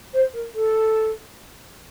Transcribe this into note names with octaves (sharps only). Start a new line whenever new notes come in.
C5
A#4
A4